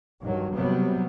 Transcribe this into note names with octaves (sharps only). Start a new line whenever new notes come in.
G2 D#3 F#3
C3 F#3 G3 B3